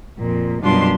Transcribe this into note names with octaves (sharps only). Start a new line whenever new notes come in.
F2 A#2
F#2 B2 G3 D4 F4 C6